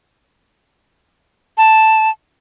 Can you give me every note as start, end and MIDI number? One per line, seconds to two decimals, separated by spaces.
1.58 2.10 81